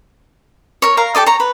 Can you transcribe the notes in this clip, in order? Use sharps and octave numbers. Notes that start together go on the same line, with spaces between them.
A#4 C#5
A#4 F5 A#5
G4 A4 D5 D#5
C#5 A#5
B4